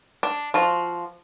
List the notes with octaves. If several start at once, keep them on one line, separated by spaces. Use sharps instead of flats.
D4
F3 F4 F#4